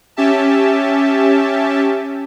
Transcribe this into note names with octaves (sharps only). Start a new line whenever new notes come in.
C#4 G4 E5 A5